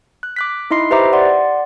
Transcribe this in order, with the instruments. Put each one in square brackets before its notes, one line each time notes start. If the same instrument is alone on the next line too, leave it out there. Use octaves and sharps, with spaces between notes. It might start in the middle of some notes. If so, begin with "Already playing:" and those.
[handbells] F#6
D6 F#6 B6
D#4 E4 D#5 C6 C7
G4 B4 C5 E5 A#5 D6
D5 F#5 C6